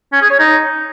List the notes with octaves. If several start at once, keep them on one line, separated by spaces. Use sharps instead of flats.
C#4
G#4
C#5
D#4